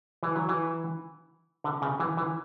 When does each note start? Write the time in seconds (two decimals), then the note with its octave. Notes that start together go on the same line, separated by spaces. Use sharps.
0.23 E3
0.35 F#3
0.49 E3
1.64 D3
1.82 C#3
2.00 E3
2.17 E3